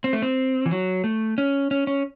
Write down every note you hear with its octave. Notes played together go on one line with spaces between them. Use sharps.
C4
A3
C4
E3
F#3
A3
C#4
C#4
C#4